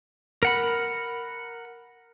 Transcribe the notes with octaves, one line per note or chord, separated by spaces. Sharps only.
A#4 F#5 B5